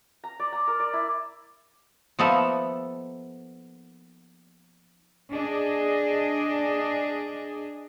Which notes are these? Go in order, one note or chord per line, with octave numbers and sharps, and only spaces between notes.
A#5
D5
A#5
A#4
D5
E4
F3 A#3 B3 D#4 A4 E5
D4 G#4 D#5